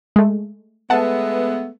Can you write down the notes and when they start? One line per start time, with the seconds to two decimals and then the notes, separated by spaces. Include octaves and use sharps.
0.16 G#3 A3
0.90 G#3 A3 B3 F#5 A5